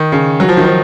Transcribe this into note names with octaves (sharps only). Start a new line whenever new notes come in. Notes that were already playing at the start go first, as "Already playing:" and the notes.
Already playing: D#3
C#3
F#3
F3
D#3
F3